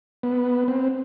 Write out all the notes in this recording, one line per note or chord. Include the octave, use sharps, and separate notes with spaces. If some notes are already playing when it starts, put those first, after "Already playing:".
B3
C4